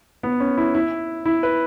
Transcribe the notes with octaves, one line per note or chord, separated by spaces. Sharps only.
B3
C#4
E4
E4
E4
B4